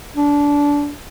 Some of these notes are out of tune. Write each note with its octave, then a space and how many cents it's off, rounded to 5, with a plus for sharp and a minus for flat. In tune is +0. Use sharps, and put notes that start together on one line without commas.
D4 -20